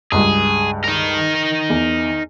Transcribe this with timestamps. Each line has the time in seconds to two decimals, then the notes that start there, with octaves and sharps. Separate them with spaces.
0.12 C#2 G2 G#4
0.84 D#4 A#4
1.70 E2